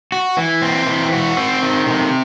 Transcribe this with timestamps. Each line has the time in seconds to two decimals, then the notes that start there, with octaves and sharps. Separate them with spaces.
0.12 F#4
0.37 E3
0.62 C4
0.86 E3
1.12 F#4
1.37 C4
1.63 D#3
1.86 C3